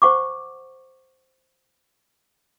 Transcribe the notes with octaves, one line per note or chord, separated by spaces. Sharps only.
C5 F#5 C#6 D6